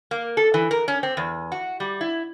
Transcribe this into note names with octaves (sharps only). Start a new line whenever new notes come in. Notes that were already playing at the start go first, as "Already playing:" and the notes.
A#3
A4
E3
A#4
C#4
C4
E2
F#4
G3
E4